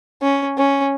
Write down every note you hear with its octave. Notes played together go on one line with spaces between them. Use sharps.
C#4
C#4